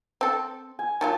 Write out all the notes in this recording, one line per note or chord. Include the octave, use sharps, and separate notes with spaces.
C4 A4
G#5
D#3 F#3 F4 A5